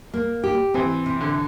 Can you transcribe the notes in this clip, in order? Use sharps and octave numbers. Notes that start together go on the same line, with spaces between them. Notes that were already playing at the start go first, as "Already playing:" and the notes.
A#3
G4
E3 C4
C3
D3